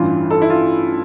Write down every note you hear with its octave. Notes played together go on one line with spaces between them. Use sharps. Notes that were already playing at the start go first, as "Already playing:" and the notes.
Already playing: A1 G2 E3 F4
A4
E4
F4